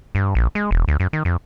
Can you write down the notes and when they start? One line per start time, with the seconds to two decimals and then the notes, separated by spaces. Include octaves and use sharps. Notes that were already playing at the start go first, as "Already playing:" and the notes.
0.15 G2
0.35 A#1
0.55 G#3
0.71 E1
0.88 D2
1.00 F#2
1.13 D#3
1.25 F2